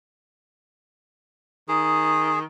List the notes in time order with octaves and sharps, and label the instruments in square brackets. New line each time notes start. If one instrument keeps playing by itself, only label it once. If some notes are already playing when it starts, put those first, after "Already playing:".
[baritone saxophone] D#3 [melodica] G#4